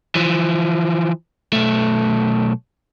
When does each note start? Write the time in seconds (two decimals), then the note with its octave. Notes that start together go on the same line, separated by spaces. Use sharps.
0.15 E3 F3
1.53 B1 A3